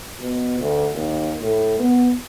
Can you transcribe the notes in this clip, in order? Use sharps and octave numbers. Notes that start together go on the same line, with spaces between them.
B2
D2
D#2
A2
B3